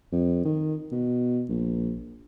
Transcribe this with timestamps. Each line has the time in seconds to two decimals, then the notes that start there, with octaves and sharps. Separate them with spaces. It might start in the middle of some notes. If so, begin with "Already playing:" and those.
0.12 F2
0.45 D#3
0.92 B2
1.49 A#1